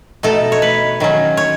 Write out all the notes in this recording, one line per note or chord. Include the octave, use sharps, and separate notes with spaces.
B2 A3 D#4 A4
C#5
B4
D#3 F#3 C#4
C#5